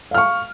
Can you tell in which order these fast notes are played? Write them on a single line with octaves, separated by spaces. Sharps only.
F5 F6 C#6